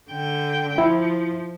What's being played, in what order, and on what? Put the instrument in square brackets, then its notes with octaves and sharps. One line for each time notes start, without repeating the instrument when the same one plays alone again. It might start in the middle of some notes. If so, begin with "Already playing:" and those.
[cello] D3 G5
[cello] F3 [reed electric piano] E4